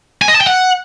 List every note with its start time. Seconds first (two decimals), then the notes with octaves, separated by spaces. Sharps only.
0.22 G#5
0.28 D#5
0.34 A5
0.41 G5
0.47 F#5